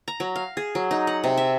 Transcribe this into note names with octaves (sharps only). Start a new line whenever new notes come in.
A#5
F#3
F5
G#4
F#3
D#4
F#5
C3
E5